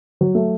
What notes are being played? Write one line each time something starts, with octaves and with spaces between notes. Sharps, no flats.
F#3
A3